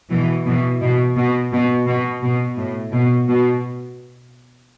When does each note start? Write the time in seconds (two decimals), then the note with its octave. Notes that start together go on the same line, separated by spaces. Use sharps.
0.10 B2 E3
0.45 B2 E3
0.81 B2
1.16 B2
1.52 B2
1.87 B2
2.22 B2
2.57 A2
2.92 B2
3.28 B2